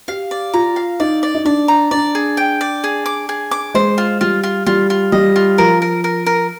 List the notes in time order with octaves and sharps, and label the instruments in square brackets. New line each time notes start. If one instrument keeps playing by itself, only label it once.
[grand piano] G4 [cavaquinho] F5
[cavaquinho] D5
[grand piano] F4 [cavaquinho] A#5
[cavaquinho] F5
[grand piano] D#4 [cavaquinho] D5
[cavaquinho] D5
[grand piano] D#4
[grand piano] D4 [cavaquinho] D5
[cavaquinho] A#5
[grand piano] D4 [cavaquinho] D5
[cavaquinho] G#4
G5
D5
G#4
D6
G#4
D6
[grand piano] G#3 [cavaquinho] C5
[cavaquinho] F4
[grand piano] G3 [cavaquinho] F4
[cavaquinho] F4
[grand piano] G3 [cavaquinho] F4
[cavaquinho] F4
[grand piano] G3 [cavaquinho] D#5
[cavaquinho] F4
[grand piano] F3 [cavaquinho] A#4
[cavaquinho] A#4
A#4
A#4